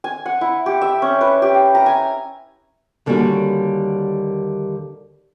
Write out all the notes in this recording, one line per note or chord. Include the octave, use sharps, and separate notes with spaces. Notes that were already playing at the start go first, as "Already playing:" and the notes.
G#5
F#5
E4
G4
E5
C#4
B4
G4
G5
A#5
G#5
D#2 D3 G3 A#3 C#4 F#4